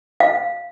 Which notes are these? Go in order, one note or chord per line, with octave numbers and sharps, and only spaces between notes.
F5